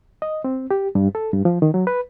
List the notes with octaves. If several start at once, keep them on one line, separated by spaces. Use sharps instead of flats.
D#5
C4
G4
G2
A4
G2
F3
D#3
F#3
B4